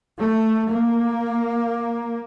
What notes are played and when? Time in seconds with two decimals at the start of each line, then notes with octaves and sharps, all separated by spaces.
0.19 A3
0.70 A#3